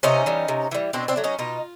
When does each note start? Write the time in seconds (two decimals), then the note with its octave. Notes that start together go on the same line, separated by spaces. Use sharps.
0.03 C3 C#4 D#4
0.26 E3 G3
0.48 C3
0.71 E3 G3
0.93 B2 C4 D4
1.08 C4 D4
1.16 F#3 A3
1.24 C#4 D#4
1.39 B2 D#4 F4